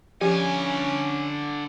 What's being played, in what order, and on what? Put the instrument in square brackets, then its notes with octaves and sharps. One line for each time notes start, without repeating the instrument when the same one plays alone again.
[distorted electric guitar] D3 G#5 [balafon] F3 [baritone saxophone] C#4 [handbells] G4